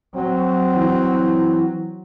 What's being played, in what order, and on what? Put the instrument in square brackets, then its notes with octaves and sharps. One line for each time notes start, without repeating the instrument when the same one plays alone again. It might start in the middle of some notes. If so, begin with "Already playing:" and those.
[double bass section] F#3 [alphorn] C4
[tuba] E3